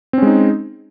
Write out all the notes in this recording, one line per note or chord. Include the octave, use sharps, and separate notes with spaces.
G#3 C4 C#4 D#4